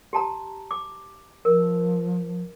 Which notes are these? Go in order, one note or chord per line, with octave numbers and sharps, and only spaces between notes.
G4 A5 A#5
D6
F3 A#4